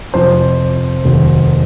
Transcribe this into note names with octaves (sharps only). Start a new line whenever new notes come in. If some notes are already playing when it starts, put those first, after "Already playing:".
F2 C3 F3 C5
F1 D#2 D#3 F#3